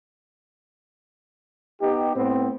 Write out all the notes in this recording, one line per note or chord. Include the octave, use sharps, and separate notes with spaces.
B3 D#4 G4
A2 B3 C4